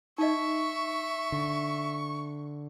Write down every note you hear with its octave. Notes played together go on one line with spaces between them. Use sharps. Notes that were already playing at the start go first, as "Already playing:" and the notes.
D#4 D#5 E5 C#6
D3